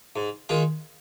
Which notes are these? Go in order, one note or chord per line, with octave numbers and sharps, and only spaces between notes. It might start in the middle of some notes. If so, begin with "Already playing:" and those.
G#2
D#3 G#3 F4